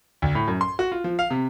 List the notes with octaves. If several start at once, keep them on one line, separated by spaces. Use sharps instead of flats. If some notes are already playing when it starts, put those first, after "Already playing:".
D2
A2
F#2
C6
F#4
F4
F3
F5
C3